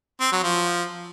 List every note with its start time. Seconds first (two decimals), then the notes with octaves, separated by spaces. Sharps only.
0.20 C4
0.32 F#3
0.43 F3